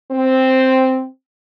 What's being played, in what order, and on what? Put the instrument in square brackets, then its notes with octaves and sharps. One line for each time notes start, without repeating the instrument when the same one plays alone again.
[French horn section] C4